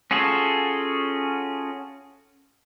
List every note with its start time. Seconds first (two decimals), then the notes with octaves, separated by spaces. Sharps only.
0.11 C#4 F4 F#4 G#4 A4